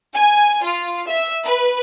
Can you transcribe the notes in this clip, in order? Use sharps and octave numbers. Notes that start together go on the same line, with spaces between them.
G#5
F4
E5
B4